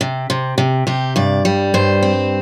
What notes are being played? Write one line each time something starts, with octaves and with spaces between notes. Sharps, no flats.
C3
C3
C3
C3 G4
G2 D5
G3
G2 C5
C4